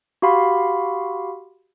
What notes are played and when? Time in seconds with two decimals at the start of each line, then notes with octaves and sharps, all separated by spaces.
0.22 F#4 G4 F5 B5 C6